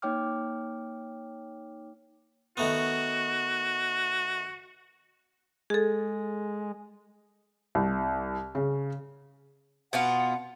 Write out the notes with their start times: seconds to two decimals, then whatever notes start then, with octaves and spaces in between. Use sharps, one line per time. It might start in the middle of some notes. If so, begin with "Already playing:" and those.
0.02 A#3 D#4 C#5 G5 D6 F6
2.57 D#3 A3 B3 F#4
5.70 G#3 G#4 A4
7.75 C2
8.55 C#3
9.93 B2 B3 F4 F#5